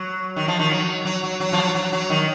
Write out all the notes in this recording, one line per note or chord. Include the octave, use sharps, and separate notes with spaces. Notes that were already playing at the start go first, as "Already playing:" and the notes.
Already playing: F#3
D#3
F3
D#3
F#3
F#3
F#3
F#3
F3
F#3
F#3
F#3
D#3